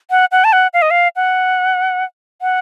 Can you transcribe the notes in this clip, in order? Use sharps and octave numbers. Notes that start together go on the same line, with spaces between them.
F#5
F#5
A5
F#5
F5
D#5
F5
F#5
F#5